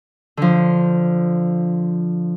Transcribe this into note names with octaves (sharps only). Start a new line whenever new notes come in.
D3 F3